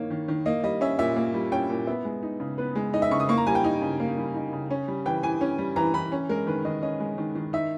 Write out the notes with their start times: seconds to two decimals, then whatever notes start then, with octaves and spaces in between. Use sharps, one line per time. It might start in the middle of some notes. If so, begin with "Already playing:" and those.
Already playing: D#3 A#3 D#4 C#5
0.10 D#3
0.28 D#3
0.46 A#3 D#5
0.63 G3 D#5
0.81 C#4 E5
0.99 A#2 E5
1.16 A#3
1.34 G3
1.52 C#4 G5
1.70 A#2
1.87 B3 E5
2.05 G#3
2.23 D#4
2.40 C#3
2.58 B3 B4
2.76 G#3
2.93 D#4 D#5
3.02 E5
3.11 C#3 C#6
3.20 D#6
3.29 A#3 C#6
3.38 A#5
3.47 G3 G#5
3.55 G5
3.64 D#4
3.82 C#3
4.00 A#3
4.17 G3
4.35 D#4
4.53 C#3
4.70 C#4
4.88 G3
5.06 E3 G5
5.23 E3 G#5
5.41 C#4
5.58 G3
5.76 E3 A#5
5.94 E3 B5
6.12 C#4
6.29 G#3 A#4
6.47 D#3 B4
6.65 D#3 D#5
6.83 C#4 D#5
7.00 G#3
7.18 D#3
7.35 D#3
7.53 D#4 E5